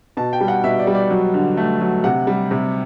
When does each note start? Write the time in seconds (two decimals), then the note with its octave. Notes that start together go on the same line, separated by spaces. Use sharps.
0.17 B2 A5
0.33 G5
0.41 G3
0.48 F#5
0.64 B2 E5
0.79 D5
0.87 G3
0.95 D5
1.11 F#3
1.34 D3
1.57 A3
1.81 F#3
2.04 C3 F#5
2.27 G3
2.51 C3